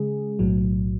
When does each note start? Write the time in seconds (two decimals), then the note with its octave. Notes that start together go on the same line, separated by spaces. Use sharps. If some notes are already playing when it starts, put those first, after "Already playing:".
Already playing: C#3 G#3 G#4
0.39 B1 A2 F#3